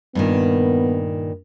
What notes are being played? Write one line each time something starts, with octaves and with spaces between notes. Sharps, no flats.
G2 A#2 D#3 B3